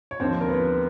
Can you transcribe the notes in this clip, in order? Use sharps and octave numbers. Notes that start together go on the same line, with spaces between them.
C#5
D#2 D3 F3 C4 C5
A#4
B3 B4